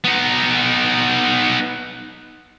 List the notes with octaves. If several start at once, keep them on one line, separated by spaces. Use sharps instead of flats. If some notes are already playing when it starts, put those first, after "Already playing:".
B3 D#4